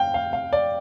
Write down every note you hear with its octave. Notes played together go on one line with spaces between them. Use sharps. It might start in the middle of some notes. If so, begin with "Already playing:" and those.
Already playing: F5 G5
F5
F5
D5